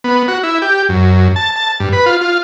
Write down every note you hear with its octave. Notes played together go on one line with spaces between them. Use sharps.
B3
F#4
E4
G4
F#2
A5
A5
G2
B4
F4
F4